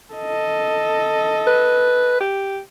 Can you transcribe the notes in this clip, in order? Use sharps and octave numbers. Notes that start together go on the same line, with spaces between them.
A4 D#5
B4
G4